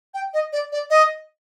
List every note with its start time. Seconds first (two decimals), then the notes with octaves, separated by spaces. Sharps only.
0.14 G5
0.34 D#5
0.53 D5
0.72 D5
0.90 D#5